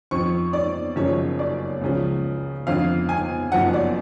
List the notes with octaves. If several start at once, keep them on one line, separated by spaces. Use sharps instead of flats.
F2 F3 C#6
D5
F#1 F#2 C#3 F3 C#5
D5
C#2 C#3 F3
F2 D3 F3 F5
G#5
F#1 F#2 F3 F#5
D5